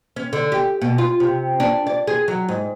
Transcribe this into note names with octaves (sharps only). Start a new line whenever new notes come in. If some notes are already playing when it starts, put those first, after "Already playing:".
C#4
D3
G4
B2
F4
C3
D4
D5
G#4
F#3
G#2